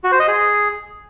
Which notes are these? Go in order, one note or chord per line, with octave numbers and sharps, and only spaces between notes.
F#4
C5
D#5
G#4